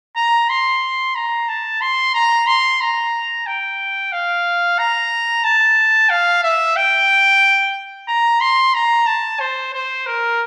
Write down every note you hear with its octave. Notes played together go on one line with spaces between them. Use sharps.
A#5
C6
A#5
A5
C6
A#5
C6
A#5
G5
F5
A#5
A5
F5
E5
G5
A#5
C6
A#5
A5
C5
C5
A#4